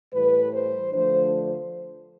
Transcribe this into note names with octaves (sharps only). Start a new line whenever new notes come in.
A2 E3 G3 B4
C5
D3 F3 A3 D4 C5